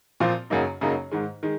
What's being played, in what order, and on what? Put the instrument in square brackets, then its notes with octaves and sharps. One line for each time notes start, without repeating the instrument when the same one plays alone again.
[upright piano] A#2 F3 C4 F4
F#2 C#3 F#3 A#3 D#4
F#2 C#3 F#3 A#3 D#4
G#2 D#3 G#3
D#3 G#3